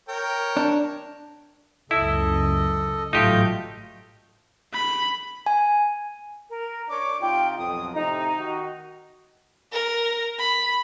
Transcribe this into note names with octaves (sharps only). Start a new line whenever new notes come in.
A#4 C#5 G5
D4
F#1 C#2 C#3 E4 A4 D#5
A1 G#2 F#3 A3 D#4 F4 G4 G6
B5
G#5
A#4
D4 C#5 D6
C3 D#4 F4 G5
B1 F2 D#6
A2 C3 D#4 A#5
D#3 F#4
A#4
B5